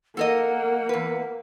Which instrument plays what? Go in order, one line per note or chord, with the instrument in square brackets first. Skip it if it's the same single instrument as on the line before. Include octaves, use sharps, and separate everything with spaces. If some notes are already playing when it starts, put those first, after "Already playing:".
[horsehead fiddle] A#3 [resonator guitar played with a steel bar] A4 A#4 D#5 [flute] F#5
[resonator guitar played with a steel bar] E2 B4